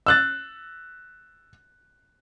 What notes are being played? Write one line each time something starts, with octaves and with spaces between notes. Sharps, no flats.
E6 F#6 A6